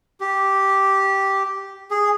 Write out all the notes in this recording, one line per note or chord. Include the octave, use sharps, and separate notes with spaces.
G4
G#4